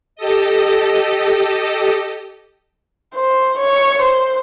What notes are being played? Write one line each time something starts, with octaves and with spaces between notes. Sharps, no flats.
G4 A4 D#5
C5
C#5
C5